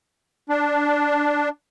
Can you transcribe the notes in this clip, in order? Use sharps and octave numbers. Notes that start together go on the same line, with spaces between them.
D4